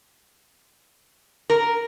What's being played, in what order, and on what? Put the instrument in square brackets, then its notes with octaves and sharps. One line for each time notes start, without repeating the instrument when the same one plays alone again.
[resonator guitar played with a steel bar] A#4